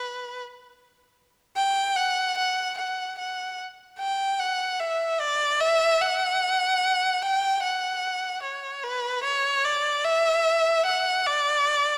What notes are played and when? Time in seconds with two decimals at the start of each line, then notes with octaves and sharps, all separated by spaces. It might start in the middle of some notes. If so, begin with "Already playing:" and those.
Already playing: B4
1.56 G5
1.96 F#5
2.38 F#5
2.78 F#5
3.19 F#5
3.99 G5
4.40 F#5
4.80 E5
5.20 D5
5.60 E5
6.01 F#5
7.22 G5
7.63 F#5
8.43 C#5
8.84 B4
9.24 C#5
9.65 D5
10.05 E5
10.86 F#5
11.27 D5